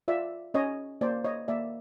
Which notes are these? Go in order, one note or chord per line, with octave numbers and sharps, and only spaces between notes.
F4 D5 E5
C#4 C#5 D#5
A#3 C5 D5
C#5 D#5
A#3 D5 E5